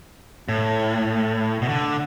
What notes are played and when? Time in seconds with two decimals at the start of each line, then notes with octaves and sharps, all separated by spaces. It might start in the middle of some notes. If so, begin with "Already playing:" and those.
0.49 A2
1.62 B2
1.68 D3